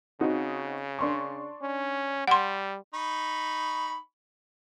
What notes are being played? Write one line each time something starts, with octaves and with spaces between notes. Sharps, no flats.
C#3 C4 D#4 F#4
D4 C6 C#6
C#4
G3 F#5 C6
D#4 B5 C#6